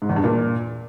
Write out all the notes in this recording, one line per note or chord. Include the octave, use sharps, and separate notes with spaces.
G#2
E2
G2
A#2